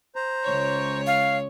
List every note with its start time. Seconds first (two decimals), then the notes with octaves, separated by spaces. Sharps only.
0.16 C5 A#5
0.45 C#2 C#5
1.07 F5